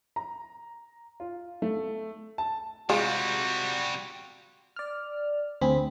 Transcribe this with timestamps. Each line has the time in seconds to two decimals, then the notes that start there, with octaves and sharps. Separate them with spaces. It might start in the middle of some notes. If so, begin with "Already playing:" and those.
0.16 A#5
1.20 F4
1.62 A3
2.38 A5
2.90 C3 G3 G#3 F4 F#4
4.76 D5 F6
5.61 D2 C4 G#4 B5